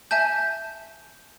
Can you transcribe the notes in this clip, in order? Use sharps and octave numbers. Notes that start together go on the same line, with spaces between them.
E5 G#5 A5 G6